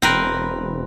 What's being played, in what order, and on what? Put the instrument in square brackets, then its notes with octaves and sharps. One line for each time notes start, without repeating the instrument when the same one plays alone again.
[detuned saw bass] E1 [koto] C4 A#4 B4